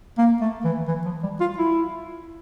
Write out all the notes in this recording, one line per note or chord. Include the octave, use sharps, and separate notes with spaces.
A#3
A3
E3
E3
F3
G3
F4
E4